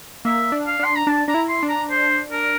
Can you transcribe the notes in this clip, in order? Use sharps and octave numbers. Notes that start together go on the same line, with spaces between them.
A#3 E5
D4
F5
D4 C6
A#5
D4 A5
D4 A#5
E4
C6
D4
A#5
C5
A#4